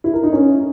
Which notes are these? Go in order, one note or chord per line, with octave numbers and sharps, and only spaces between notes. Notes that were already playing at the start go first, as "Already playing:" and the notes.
E4
A#4
D#4
C#4